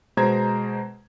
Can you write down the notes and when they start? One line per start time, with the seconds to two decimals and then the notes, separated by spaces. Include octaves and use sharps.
0.17 B2 G#3 C5 A#5 G#6